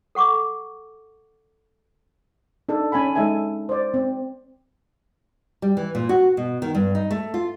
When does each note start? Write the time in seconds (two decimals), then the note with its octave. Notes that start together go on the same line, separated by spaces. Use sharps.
0.15 A4 F#5 C#6 D6
2.69 D4 D#4 A4
2.92 C#4 G#5 A5 B5
3.15 G#3 D#4 A4 E5 G#5
3.69 C5 D5
3.94 C4
5.62 G3
5.77 E3
5.95 A#2
6.09 F#4
6.37 B2
6.62 D#3
6.75 G2
6.95 D#4
7.11 A3
7.34 F4